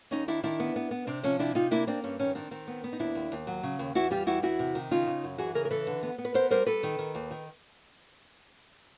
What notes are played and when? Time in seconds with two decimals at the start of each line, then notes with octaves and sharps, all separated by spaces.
0.11 D#2 C#4 D#4
0.28 D#3 D4 E4
0.43 D#3 D4 E4
0.60 B3
0.76 B3
0.91 B3
1.07 C3 C4 D4
1.23 F3 C#4
1.39 C3 D4 E4
1.55 C3 D#4 F4
1.71 A#3 D4 E4
1.87 A#3 C4 D4
2.04 G2 C#4
2.19 D#3 C#4
2.35 D#3 C4 D4
2.51 D#3 C4
2.68 B3
2.84 B3
2.93 D#4
2.99 D#2 D4 E4
3.15 D#2
3.32 D#2
3.47 F#3
3.63 C#3
3.79 D#2
3.95 E2 E4 F#4
4.11 G3 F4 G4
4.27 E2 E4 F#4
4.43 E2 E4 F#4
4.59 C3
4.75 D#3
4.91 C#3 D#4 F4
5.07 C#3
5.23 F#2
5.38 E3 F#4 G#4
5.55 C#3 G#4 A#4
5.65 A#4
5.70 E3 A4 B4
5.87 D3
6.03 B3
6.18 B3
6.25 B4
6.34 B3 A#4 C5
6.50 G3 A#4 C5
6.66 G3 A4 B4
6.83 D#3
6.99 D#3
7.15 D#2
7.31 D#3